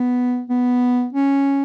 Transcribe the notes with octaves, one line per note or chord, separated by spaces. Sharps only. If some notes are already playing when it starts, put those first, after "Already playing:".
Already playing: B3
B3
C#4